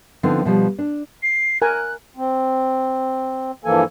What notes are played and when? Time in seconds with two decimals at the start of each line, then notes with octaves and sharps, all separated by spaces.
0.23 D3 F3 B3 C4 D#4
0.45 B2 F3 G3
0.79 D4
1.23 C7
1.62 A#4 G#5 F#6
2.17 C4
3.65 G2 E3 F3 A#3 A4 G#5